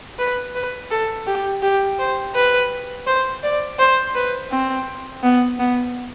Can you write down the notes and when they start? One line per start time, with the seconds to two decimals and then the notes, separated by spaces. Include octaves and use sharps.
0.19 B4
0.55 B4
0.91 A4
1.27 G4
1.62 G4
1.99 C5
2.35 B4
3.07 C5
3.43 D5
3.79 C5
4.15 B4
4.51 C4
5.23 B3
5.59 B3